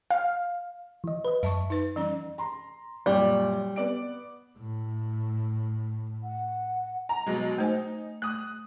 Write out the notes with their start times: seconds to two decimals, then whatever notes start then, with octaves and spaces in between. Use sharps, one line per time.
0.11 F5
1.04 E3 D#5
1.25 B4 D#5
1.43 F#2 E5 A5 C#6
1.70 D#4 B4
1.96 E3 G3 C#4
2.38 A#5 C6
3.06 F#2 A#2 G3
3.76 B3 D5 D7
4.58 A2
6.24 F#5
7.09 A#5
7.27 B2 F#3 G#3
7.58 A3 D#4 C5 G#5
8.22 A3 D#6 F#6